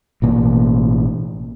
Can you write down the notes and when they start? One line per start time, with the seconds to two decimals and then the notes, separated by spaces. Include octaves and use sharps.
0.22 A1 B2 A#3